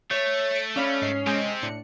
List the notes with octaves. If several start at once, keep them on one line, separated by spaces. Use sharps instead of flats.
A3 C#5
C#7 D7
C#4 D5 F5 B5
G#2 D#5 C7
C3 G#3 C4 D#5 G#5
A2 D4 C#7